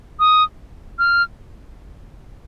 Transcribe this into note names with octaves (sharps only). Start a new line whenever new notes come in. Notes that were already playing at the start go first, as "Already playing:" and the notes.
D#6
F6